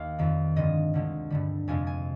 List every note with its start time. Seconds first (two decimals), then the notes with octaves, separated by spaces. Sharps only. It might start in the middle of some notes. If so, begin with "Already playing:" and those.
Already playing: D#2 F5
0.19 F2 D#3 G3
0.56 G2 D3 F3 G#3 D#5
0.94 D2 D3 G#3
1.30 G2 D3 G3
1.68 F2 C3 F3 G#3 G#5
1.87 G#5